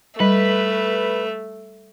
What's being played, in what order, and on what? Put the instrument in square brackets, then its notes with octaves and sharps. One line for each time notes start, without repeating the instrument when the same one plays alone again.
[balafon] G3 [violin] A3 [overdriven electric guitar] B4